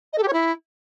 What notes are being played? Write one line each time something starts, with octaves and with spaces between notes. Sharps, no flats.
D#5
A4
G4
C#5
E4